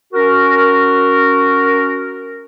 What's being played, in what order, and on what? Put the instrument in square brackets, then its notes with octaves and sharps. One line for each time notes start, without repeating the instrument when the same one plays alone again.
[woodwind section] C#4 F#4 A#4